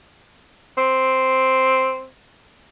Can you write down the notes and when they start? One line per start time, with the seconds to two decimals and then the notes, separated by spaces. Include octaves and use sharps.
0.77 C4